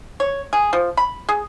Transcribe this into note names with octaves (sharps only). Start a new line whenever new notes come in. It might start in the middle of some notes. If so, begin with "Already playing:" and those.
C#5
G#4
F3
B5
G#4